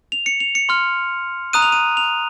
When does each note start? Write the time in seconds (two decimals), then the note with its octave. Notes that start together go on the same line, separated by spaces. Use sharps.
0.12 F7
0.26 C#7
0.40 F7
0.55 C#7
0.69 C6 F6
1.53 A#5 D#6 F#6 D#7
1.62 F7
1.72 D#7
1.97 F7